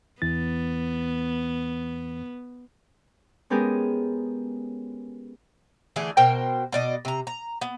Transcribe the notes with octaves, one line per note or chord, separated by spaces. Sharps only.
E2 E3 B3 A6
G#3 B3 C#4 G4 G#4 A#4
D3 E3 A3 G#4
B2 A#4 C5 G5
B2 D5 D#5
C3 A#5
A#5
B3